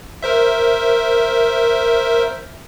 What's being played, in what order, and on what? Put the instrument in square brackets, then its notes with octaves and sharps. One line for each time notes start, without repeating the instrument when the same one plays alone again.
[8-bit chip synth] A#4 C5 E5